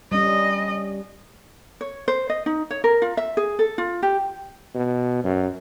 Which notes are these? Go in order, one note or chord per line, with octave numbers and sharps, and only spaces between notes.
G3 C#4 D#5
C#5
C5
D#5
D#4
C#5
A#4
F4
E5
G#4
A4
F4
G4
B2
F#2